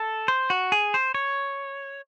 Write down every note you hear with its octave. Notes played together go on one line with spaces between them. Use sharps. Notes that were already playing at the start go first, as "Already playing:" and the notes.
Already playing: A4
C5
F#4
G#4
C5
C#5